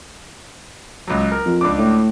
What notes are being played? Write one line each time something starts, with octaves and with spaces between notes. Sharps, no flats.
C#2 F#3
A#4
F2
C#2 D4 D6
A2